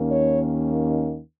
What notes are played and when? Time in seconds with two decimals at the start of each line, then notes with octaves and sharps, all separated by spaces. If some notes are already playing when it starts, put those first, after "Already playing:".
Already playing: D#2 D#3 A#3 C#4
0.11 C#5